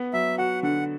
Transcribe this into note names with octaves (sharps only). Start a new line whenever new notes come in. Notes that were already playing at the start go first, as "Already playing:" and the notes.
Already playing: B3
F#3 E5
F#4 F#5
D3 F#5